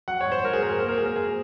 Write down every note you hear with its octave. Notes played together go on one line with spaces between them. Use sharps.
F#3 F#5
C#5
G#2
C5
G#2 A#4
G#4
F#3 A#4
G#4
A#3 C5
A#4
A#3 G#4
A#4
A#3 G#4